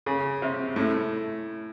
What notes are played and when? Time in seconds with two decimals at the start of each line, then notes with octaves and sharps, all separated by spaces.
0.06 C#3
0.42 C3
0.76 A2